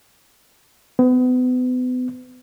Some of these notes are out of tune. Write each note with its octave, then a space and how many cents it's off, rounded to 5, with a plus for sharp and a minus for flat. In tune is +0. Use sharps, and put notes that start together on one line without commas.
B3 +35